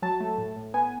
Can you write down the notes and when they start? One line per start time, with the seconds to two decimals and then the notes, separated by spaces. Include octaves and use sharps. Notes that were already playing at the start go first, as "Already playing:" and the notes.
0.02 F#3 A5
0.20 A3
0.38 A2
0.56 A2
0.74 B3 G#5